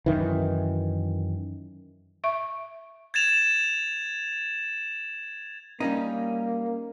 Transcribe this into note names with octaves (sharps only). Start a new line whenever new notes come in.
F#2 D#3 E3
E5 C#6
G#6 A6 E7 F7
G3 A#3 C#4 D#4